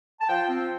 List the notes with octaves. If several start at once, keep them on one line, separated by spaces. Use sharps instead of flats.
A5
F3 G5
C4